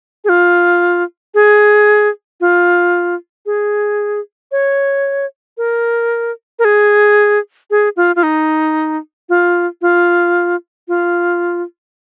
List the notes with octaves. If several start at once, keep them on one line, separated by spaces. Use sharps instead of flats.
G#4
F4
G#4
F4
G#4
C#5
A#4
A#4
G#4
G#4
F4
F4
D#4
F4
F4
F4